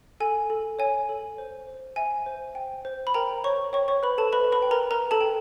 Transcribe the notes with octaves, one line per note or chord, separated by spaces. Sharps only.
A4 G#5
A4
C#5 G#5
A4
C5
C5
E5 G#5
C5
G5
C5
B5
A#4 G5 A#5
C5 C#5 C#6
C#5 G5 C#6
C#5 C#6
B4 C5 B5
A4 A5
B4 D#5 B5
B4 B5
G5
A#4 A#5
A#4 B4 A#5
A4 A5
G5